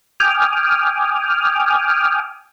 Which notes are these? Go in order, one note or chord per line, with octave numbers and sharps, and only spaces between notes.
G5 G#5 D6 D#6 F6